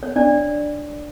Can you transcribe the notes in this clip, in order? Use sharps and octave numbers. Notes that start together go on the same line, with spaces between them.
C#5
D4 D5